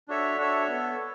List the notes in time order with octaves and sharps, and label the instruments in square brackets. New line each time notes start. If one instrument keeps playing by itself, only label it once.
[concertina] D4 F#4 A4 C#5 E5
D4 F#4 A4 C#5 E5
B3 A4